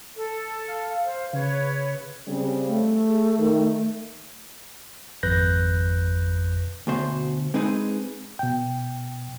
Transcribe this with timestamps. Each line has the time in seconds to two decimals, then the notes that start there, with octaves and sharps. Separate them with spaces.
0.16 A4
0.68 F5
1.04 C5
1.33 C#3 B4 C#5
2.27 C#3 G3 C4
2.68 A3
3.08 G#4
3.38 D#3
5.23 G#1 F2 B4 F#6 G6 A#6
6.87 D2 B2 C5
7.54 G#3 C4 D#4 G#4 B4
8.39 B2 G5